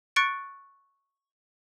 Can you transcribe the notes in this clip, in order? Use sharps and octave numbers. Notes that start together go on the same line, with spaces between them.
C#6 F#6 A6 C#7 D7